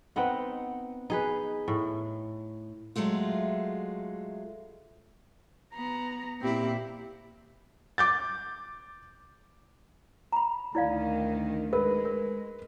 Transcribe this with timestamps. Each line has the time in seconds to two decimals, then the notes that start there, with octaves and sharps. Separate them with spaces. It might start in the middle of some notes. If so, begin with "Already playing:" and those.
0.16 B3 C4 D#4 F#5
1.10 D#4 G#4 B4
1.68 A2
2.96 F#3 G#3 A3 F4
5.74 B3 A#5
6.41 A#2 C4 E4 G4
7.98 D6 G6 A6
10.33 A#5 B5
10.75 D2 D#3 E4 D5 F5
11.73 G#3 A#4 B4
12.05 A#4